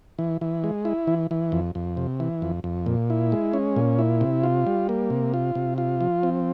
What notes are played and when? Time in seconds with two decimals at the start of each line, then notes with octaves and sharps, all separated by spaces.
0.19 E3
0.41 E3
0.64 G#3
0.85 E4
1.07 E3
1.31 E3
1.52 F2
1.75 F2
1.97 C3
2.20 E3
2.42 F2
2.64 F2
2.86 A#2
3.10 E4
3.32 G#3
3.53 C#4
3.76 A#2
3.99 E4
4.21 C3
4.44 F4
4.67 G3
4.89 A#3
5.10 C3
5.34 F4
5.55 C3
5.78 F4
6.01 F3
6.23 C4